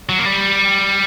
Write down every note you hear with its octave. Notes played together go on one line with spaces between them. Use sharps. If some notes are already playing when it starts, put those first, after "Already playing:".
F#3
A#3
G3